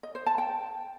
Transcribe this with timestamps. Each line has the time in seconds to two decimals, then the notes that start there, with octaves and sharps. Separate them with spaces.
0.03 D#5
0.15 C5
0.26 A5
0.38 G5